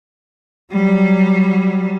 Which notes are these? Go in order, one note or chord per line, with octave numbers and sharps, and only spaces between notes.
F#3 G3